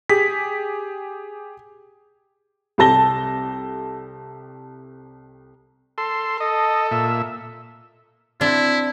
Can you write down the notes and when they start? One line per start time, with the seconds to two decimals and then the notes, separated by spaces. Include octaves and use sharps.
0.09 G4 G#4 B6
2.78 C2 G4 A4 A5 A#6 G7
5.98 A4 C6
6.40 A4 D#5
6.91 A#2 E5
8.41 C4 D4 E4